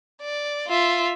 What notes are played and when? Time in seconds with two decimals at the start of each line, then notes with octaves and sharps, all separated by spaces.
0.22 D5
0.68 F4 E5